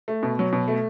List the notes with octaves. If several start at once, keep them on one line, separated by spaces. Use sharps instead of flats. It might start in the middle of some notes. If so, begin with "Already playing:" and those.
A3
B2
F#3
B2
A3